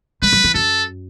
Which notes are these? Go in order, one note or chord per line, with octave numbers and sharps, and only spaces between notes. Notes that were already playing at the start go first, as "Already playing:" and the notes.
G#3 B4
F#3
E3
F#2 A4